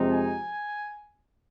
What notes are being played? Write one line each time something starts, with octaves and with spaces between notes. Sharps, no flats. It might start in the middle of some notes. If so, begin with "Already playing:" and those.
Already playing: F2 C3 G#3 C4 D#4
G#5